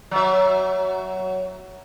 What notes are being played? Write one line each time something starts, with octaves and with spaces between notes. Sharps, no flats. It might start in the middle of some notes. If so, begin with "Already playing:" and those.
F#3 E5